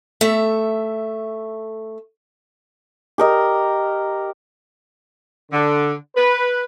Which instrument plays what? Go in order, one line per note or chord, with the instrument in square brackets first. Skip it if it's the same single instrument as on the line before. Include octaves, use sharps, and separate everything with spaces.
[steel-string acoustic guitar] A3 E5
[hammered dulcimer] G4 A#4 D#5
[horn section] D3
B4